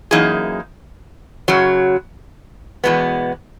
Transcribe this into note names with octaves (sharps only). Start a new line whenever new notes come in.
F#2 E3 A#3 D#4 G#4
F#2 C#3 F#3
E2 B2 G#3 B3